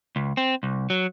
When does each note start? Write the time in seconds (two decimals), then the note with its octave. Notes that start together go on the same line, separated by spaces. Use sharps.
0.16 C#2
0.37 C4
0.63 C2
0.90 F#3